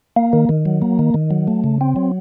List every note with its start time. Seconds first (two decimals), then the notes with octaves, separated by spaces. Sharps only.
0.16 A#3
0.33 D#3
0.49 D#3
0.66 F#3
0.82 A#3
0.99 D#3
1.14 D#3
1.31 F#3
1.48 A3
1.64 C#3
1.81 C4
1.96 F#3